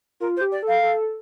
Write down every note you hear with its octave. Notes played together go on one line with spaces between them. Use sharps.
F4 A#4
C5
G4
D5
A4
F5
A4